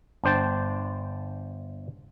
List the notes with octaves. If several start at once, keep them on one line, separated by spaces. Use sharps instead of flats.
G1 D4 C5 G5 A5